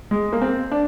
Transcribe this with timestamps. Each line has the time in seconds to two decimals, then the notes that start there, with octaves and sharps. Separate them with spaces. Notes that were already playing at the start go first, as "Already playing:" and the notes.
0.11 G#3
0.33 A#3
0.42 C4
0.71 D4